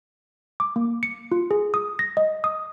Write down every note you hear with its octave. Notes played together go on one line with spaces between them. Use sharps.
D6
A#3
C#7
F4
G#4
D#6
A#6
D#5
D#6